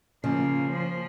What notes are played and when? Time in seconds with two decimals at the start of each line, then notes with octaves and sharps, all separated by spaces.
0.24 C#3 F3 A#3
0.70 F3